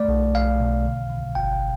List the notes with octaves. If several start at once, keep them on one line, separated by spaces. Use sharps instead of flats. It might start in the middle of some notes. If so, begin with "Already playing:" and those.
Already playing: A3 D5
B1
B1 F5
B2
D3
D3
G1 G5